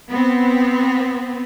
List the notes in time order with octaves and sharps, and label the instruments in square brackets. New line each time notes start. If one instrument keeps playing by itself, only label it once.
[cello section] B3 C4